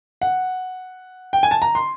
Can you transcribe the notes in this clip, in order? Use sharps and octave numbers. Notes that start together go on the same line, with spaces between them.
F#5
G5
G#5
A5
A#5
C6